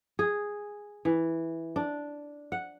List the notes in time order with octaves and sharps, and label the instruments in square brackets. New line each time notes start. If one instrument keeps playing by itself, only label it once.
[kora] G#4
E3
D4
F#5